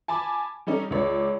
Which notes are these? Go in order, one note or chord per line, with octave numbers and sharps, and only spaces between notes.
G#5 A5 B5 D6
G3 C#4 D#4 A4
C#2 C#5 D5